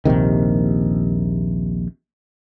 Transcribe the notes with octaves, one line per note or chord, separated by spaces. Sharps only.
A#1 D#2 C3 D#3